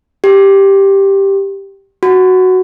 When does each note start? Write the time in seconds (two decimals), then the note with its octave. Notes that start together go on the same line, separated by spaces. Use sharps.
0.24 G4
2.03 F#4